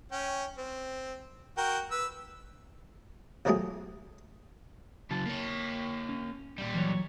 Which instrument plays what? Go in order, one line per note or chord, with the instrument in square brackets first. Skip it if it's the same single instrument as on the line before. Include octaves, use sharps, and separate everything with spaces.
[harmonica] C#4 G5
C4
F#4 A#4 G5
B4 E6
[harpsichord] B1 F3 F#3 A3 G4 G#4
[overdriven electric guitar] C#3 F#3 [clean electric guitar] A5
[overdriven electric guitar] A#3 C#5
[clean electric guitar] C#4
[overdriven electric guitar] A#2 G3
[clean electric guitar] E3 F#3 C#5